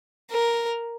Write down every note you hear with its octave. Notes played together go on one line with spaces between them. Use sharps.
A#4